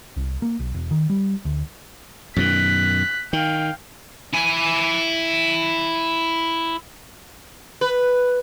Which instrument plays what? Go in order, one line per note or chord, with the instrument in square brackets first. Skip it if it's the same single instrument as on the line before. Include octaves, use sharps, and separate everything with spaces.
[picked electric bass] C2
A#3
B1
E1
D#3
G3
D2
[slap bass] F#2 B2 D#3 [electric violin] F#6 B6
[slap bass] D#3 [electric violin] F5 G5
[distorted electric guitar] E4 G#5
[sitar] B4